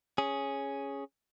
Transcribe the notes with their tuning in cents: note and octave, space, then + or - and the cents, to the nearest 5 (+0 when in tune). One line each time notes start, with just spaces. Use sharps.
C#4 +0 G#4 +0